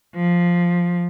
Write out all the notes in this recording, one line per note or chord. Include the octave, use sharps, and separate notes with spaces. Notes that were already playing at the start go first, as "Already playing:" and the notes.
F3